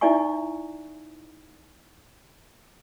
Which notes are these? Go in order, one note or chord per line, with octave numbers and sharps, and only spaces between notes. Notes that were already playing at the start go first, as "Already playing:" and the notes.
D#4 E4 D5 E5 G#5 C#6